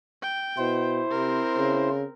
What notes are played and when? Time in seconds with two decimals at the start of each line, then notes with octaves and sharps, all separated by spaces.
0.23 G5
0.58 B2 E4 C5
1.11 C3 C4 A#4
1.57 C#3